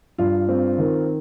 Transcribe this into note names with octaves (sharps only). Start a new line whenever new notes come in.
G2 F4
C4
D#3